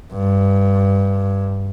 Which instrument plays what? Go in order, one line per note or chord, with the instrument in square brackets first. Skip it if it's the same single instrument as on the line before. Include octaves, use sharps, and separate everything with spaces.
[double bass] G2